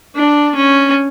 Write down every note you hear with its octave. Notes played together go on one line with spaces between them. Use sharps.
D4
C#4